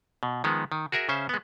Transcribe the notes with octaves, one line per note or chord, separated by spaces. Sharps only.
B2
D#3 F3 G#3 B3
D#3
F#4 G#4 A#4 E5
C#3 C#4 C5 E5
G#3 B3